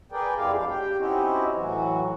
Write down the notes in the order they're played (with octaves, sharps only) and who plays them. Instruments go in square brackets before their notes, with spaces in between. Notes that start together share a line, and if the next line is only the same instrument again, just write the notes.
[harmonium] G#4 A#4 B4 D5 G5
F2 G#3 E4 G4 D5 F5
F#3 G#3 D4 F5
G4 G5
C4 C#4 D#4 E4 F#4 G4
A2 E3 F#3 F#4